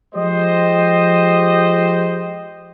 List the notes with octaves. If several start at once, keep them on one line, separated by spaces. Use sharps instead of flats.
F3 G#3 G4 C5 D#5